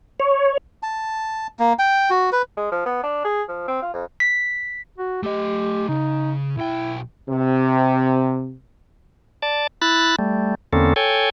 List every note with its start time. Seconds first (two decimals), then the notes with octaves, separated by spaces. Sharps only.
0.20 C#5
0.83 A5
1.59 A#3
1.79 G5
2.10 F#4
2.32 B4
2.57 G#3
2.72 F3
2.86 B3
3.03 D4
3.25 G#4
3.49 F3
3.68 C4
3.82 F4
3.94 F2
4.20 B6
4.98 F#4
5.23 A3 G4 D#5
5.88 C#3 D#4
6.57 B1 E4 G5
7.29 C3
9.42 D5 A5
9.82 E4 B5 F#6 A6
10.19 G3 A3
10.73 E2 D3 A#3 C4 C#4 A4
10.96 A4 C#5 G5 G#5